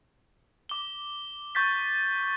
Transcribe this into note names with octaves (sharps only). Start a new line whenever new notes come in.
D6 G7
C#6 G6 A6 B6